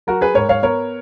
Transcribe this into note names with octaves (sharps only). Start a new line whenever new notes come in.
F#3 F#4 A#4
G#4 B4
G#2 A#4 C#5
C#5 F5
B3 A#4 C#5